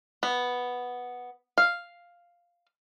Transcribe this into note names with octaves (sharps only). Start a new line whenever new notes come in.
B3
F5